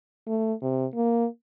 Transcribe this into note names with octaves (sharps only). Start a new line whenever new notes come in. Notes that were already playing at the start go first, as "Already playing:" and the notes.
A3
C3
A#3